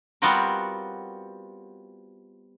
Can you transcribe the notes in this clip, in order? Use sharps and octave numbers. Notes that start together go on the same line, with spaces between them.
G3 B3 C4 F4 F#4 A#4